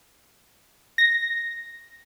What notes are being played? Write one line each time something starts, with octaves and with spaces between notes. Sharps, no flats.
A#6